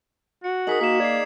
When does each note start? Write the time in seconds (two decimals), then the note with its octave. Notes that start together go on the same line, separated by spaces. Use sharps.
0.44 F#4 C#7
0.67 D#4 G#4 A#4 D#6 B6 F#7
0.81 A#3 F#4 B6 E7
1.00 D5 G#6 C7